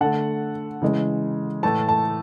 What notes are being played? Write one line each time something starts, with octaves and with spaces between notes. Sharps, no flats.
D3 A3 F#5 A5
C#3 E3 G#3
A2 E3 A3 A5
A5